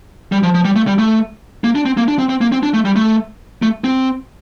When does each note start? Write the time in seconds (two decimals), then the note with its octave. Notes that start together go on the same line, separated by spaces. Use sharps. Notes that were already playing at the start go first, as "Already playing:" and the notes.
0.32 G3
0.43 F3
0.54 F3
0.65 G3
0.76 A3
0.87 G3
0.98 A3
1.64 A#3
1.75 D4
1.86 C4
1.97 A#3
2.08 D4
2.19 C4
2.29 C4
2.41 A#3
2.52 C4
2.63 D4
2.74 A3
2.85 G3
2.96 A3
3.62 A3
3.84 C4